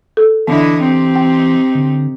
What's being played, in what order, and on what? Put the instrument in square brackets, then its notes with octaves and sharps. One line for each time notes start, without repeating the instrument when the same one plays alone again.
[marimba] A4
[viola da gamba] D3 E4 D#5 [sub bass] E3 [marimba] B3
[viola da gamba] C4 D#4 G4
[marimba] G5
[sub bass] D3